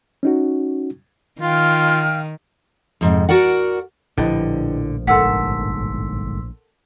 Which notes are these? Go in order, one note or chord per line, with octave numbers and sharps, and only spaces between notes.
C#4 D#4 F#4
D#3 F4 F5 G5 F6
F2 G#2 C3
F#4 A#4 D5 F#5
A#1 A2 D3 F3 E4 G4 B4 D#5
G1 G#2 A4 A#4 F#5 C6 E6 B6